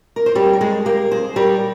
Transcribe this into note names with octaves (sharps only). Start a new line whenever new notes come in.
A#4
C5
G3 A#4 C#5
A#4
G#3 G#4 C5
A#3 G4 A#4
G#4 C5
G3 A#4 C#5